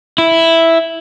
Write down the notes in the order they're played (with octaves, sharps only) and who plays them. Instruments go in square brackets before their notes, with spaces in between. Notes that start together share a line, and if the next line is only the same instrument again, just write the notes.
[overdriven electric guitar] E4